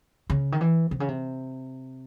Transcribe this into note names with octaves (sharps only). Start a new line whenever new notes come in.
C#3
D#3
E3
C3
C#3
C3